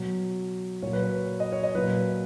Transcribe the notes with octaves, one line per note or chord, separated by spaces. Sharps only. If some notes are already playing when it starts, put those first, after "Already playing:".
Already playing: B2 F#3
A#2 F#3 C#5
B4
C#5
D#5
C#5
D#5
A#2 F#3 B4